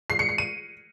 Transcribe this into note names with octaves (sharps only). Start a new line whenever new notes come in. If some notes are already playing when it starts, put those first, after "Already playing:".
C7
C#7
C7
D#7